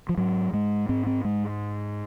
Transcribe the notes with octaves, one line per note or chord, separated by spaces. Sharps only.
F3
G#2 F#3
G#2 G#3
G#2 C4
C4
G#2 G#3